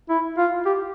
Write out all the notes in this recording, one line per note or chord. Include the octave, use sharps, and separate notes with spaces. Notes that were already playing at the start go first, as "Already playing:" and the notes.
E4
F4
G4